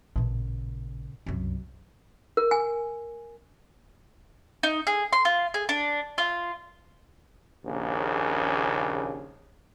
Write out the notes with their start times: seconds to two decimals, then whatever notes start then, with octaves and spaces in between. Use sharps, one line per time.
0.16 A1 A#2 C#3
1.26 C2 F#2
2.37 A#4
2.51 G#5
4.63 D#4
4.87 G#4
5.13 C6
5.25 F4
5.54 G#4
5.69 D4
6.18 F4
7.65 A#1 D#2 C#3